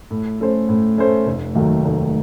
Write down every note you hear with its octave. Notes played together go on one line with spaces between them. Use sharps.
A2
A3 C#4 A4 C5
A2
A3 C#4 A4 C5
F1
D#2 D#3 F#3 A3
F1